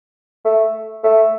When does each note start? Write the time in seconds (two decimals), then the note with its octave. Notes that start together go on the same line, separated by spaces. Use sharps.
0.45 A3
1.03 A3